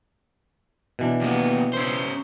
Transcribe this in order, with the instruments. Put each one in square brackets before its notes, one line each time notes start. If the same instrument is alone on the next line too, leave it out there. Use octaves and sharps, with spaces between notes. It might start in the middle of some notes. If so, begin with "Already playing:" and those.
[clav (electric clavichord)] B2 E3 D4
[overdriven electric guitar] D#2 B3
C#3 C5